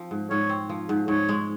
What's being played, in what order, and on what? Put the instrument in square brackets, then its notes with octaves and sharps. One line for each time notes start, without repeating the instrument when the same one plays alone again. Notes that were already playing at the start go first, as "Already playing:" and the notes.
Already playing: [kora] F3 C4
G#2
[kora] G#2 [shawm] C#5
[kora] C4
F3
G#2
[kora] G#2 [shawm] C#5
[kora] G#3